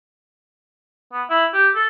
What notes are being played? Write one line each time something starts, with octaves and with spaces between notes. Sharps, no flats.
B3
E4
G4
A4